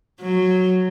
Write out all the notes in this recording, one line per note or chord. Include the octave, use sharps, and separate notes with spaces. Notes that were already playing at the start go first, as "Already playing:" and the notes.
F#3